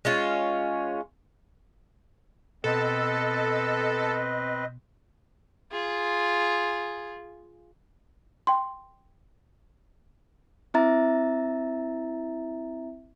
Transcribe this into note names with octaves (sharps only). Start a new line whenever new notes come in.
G#3 C#4 F4
B2 C4 A4 B4 D#5 A5
F4 G#4
G5 C6
C4 E4 E5 A#5 A6